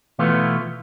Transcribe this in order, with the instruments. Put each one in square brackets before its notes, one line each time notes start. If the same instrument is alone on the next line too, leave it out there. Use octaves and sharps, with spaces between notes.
[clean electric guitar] B2 E3 A3 B3 F4